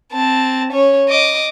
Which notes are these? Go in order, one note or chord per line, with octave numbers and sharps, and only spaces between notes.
C4 A5
C#4 C#5
D#5 D6